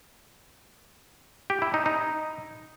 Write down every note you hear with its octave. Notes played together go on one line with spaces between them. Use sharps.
G4
E4
D#4
D#4